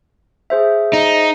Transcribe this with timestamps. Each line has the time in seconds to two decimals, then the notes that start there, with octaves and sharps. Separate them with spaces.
0.50 G#4 C5 E5
0.93 D#4